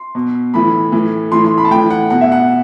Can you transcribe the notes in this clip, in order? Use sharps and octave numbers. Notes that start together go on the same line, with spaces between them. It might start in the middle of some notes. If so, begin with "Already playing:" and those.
Already playing: C6
B2
A2 E3 B5
A2 E3
A2 E3 C6
C6
B5
A5
A2 E3 G5
F#5
B2 F#5
E5
F#5